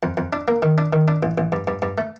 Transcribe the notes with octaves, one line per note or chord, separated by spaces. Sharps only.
F2
F2
D4
A#3
D#3
D4
D#3
D4
A1
A1
G2
G2
G2
A3